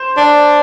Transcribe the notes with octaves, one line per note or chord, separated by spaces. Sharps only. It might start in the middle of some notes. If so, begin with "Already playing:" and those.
Already playing: C5
D4